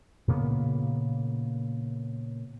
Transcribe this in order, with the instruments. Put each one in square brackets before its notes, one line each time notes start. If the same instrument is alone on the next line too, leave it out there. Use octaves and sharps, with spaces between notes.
[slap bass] A#2 C#3 A#3 B3